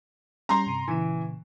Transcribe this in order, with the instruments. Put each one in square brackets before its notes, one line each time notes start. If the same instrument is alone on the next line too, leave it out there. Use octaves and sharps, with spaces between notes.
[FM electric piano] G3 C#4 [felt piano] A#5 C6
[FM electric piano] G2 C3
[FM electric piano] A#2 C#3 [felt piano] E3